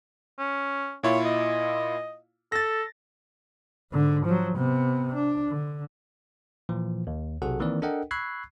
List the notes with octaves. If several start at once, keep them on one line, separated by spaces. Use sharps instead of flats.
C#4
A#2 E4 F4 C#5
D#5
A4 A6 A#6
G#2 D3
F3 F#3
C3 B3
D4
D3
A#2 E3 F3
D#2
B1 C3 F#4 G#4 A4 F#5
D#3 E3 A#3 C4 A#4 D5
D4 A4 A#4 D#5 F#5 G5
B5 C#6 E6 F#6 G#6 C7